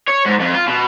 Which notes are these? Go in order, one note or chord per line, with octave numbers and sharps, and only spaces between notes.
C#5
G#2
F2
F4
B2